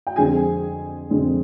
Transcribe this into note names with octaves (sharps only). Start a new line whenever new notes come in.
G5
F2 D3 G#3 C4 G#4 G#5
F2 D3 G#3 C4